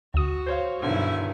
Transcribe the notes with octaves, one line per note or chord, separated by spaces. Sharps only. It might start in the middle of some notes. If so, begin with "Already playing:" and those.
D2 F#4 D#6
C5 C#5 F5
B1 G2 D3 D#3 E4 G#5